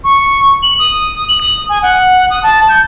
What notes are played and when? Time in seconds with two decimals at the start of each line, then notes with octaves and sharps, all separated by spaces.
0.04 C#6
0.63 F#7
0.79 D#6
1.29 F#7
1.41 D#6
1.69 G#5
1.83 F#5
2.30 D#6
2.43 A5
2.69 G6